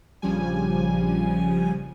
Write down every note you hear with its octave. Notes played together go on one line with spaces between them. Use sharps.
A#1 C#3 F3 G3 G#5